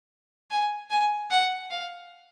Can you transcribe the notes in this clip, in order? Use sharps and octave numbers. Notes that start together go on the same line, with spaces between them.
G#5
G#5
F#5
F5